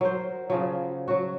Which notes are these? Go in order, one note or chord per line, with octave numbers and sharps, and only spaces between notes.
F#3 A#4 C5
C#3 F3 F#3
F#3 F#4